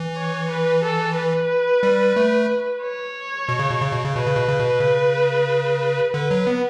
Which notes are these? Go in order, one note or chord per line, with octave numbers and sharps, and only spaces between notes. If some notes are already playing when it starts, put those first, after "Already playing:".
Already playing: E3
C#5
B4
A4
B4
G3
A3
C#5
B2
C#3
B2
C#3
B2
C#3
B2 B4
C#3
B2
C#3
B2
C#3
D3 B4
F#3
B3